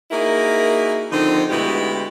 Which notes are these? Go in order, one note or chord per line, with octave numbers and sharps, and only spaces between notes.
A#3 D#4 E4 F#4 G#4 A#4
D3 D#3 F3 C4 D#4
D2 B2 G#3 B3 E4 G4